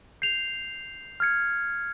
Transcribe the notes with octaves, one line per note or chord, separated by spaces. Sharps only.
G6 C7 F7
F6 G#6 C#7